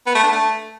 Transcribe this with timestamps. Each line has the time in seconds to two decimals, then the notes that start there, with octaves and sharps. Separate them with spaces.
0.07 B3
0.15 A3
0.23 D4
0.32 A3